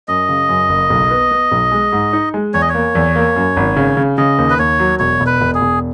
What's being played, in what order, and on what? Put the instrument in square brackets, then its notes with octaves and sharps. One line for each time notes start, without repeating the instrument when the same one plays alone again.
[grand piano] F#2 [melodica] D#5
[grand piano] C#3
F#2
F#1
B1
B3
B3
B1
G#3
G#2
D#4
G#3
[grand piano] E2 [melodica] C#5
[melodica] D#5
C#5
[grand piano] A#3
E2
A#3
F#2
G#1
C#3
C#3
[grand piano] C#3 [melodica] D#5
[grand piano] D#2
[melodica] B4
[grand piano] D#2 [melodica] C#5
[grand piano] F#3
[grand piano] E1 [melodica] C#5
[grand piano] E1
[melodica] B4
[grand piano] E1
[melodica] G#4
[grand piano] E1